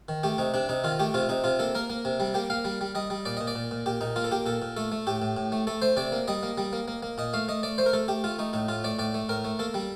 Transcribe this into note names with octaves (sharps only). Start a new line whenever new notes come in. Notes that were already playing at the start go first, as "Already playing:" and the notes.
D#3
A3 G4
C3 D#4
C3 D4
C3 D#4
D#3 F4
A3 G4
C3 F4
C3 D#4
C3 F4
A#3 A4
A#3 A#4
A#3
C3
G3
A#3 G4
A#3 F5
G3
G3
G3 D#5
G3
A#2 D5
A#2 D#5
D5
A#2
A#2
A#2 G4
A#2 D#4
A#3 F4
A4
A#3 G4
A#2 A4
A#2
A3 A4
A3
A2 G4
A2
A2
A3
A3 A4
A3 C5
C3 D5
A#3
G3 D#5
A#3
G3
A#3
A#3
A#3
A#2 D#5
A3 F5
A3 D#5
A3 D5
A3 C5
A#4
A3 A4
A3 G4
A3 F4
A3 D#4
A2 D#4
A2 F4
A3 D5
A2 D5
A3
A2 A#4
A3
A#3 A4
G3